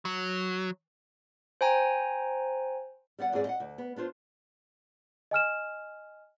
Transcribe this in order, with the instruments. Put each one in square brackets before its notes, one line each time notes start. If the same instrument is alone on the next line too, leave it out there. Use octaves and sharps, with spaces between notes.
[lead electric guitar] F#3
[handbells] C5 G5 G#5 A#5
[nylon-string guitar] G3 B3 D5 F#5
E2 G#2 C4 G#4 D5
D#5 F5 F#5
D2
B3
B3 D4 F4 C5
[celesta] D#5 G#5 F6 E7